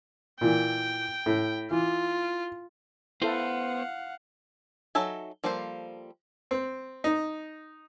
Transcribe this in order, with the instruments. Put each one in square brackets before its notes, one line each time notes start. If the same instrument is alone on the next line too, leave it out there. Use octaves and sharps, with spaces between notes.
[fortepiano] A#2 E3 [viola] G5
[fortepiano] A2
[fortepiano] E3 [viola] F4
[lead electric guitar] B3 C5 [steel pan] E4 A4 [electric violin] F5 F#5
[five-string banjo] F#3 D#4 A4 E5 G#5
F3 G3 A#3 A4 C5
[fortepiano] C4
D#4